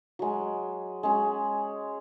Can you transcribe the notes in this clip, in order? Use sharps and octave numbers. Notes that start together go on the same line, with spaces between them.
F#3 G#3
G#3 C#4